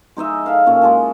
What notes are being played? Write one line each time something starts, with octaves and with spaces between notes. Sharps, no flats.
G#3 D#4 D#5 E5
A4 E5 F5
A#2 C#4
G#3 G#4 A5